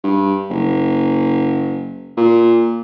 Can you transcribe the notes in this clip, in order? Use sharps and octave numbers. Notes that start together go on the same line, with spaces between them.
G2
F#1
A#2